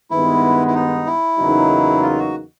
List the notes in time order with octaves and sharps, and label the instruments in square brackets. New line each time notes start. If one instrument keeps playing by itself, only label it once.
[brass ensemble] G2 D#3 G#3 B3 [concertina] E4
[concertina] E4
D#4
E4
[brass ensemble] E2 C#3 F#3 A#3 D#4
[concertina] F4
F#4